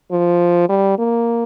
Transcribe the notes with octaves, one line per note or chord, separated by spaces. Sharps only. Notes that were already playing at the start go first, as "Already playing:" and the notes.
F3
G3
A#3